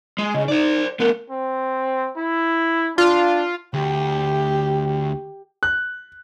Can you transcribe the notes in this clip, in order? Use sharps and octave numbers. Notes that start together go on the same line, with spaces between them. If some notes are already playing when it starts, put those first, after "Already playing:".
G#3
C#3 D#5
D#4 C5 D5
A3 B3 A#4
C4
E4
D4 F4
D2 G4
F#6